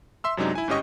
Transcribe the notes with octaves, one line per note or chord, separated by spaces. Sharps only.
E5 C6 E6
F#2 C3 F#3 G#3 D4 D#4
E4 G#5
G1 G#2 C#4 G4 D#5 C#6